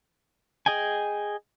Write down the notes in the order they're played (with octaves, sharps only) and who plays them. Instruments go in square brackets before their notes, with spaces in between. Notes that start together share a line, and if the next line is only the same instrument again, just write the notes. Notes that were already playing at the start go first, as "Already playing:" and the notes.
[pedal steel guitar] G#4 D#5 G5 G#5